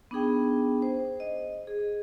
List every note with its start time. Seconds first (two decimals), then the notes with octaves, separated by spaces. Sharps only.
0.11 B3 D4 D#4 G#4 G5
0.82 C5
1.20 D#5
1.67 G#4